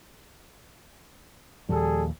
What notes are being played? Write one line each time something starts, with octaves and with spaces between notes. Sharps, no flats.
D#2 A#2 F3 G3 G#4 A4